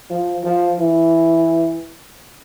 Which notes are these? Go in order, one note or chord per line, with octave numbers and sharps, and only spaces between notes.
F3
F3
E3